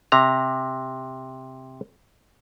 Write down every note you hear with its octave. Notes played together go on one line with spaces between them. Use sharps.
C3 A#5